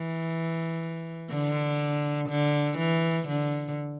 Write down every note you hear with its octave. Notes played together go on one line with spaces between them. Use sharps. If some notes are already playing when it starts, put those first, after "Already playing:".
Already playing: E3
D3
D3
E3
D3